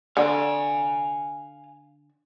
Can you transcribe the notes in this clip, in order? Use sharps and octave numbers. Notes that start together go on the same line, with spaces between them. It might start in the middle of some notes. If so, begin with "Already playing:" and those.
D3 F5 G#5